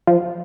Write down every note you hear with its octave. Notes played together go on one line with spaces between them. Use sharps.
F3